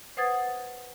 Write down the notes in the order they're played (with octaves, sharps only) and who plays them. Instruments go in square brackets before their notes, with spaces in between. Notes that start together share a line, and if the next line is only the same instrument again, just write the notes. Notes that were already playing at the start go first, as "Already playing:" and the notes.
[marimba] B4 C5 F#5 D#6 G#6 A6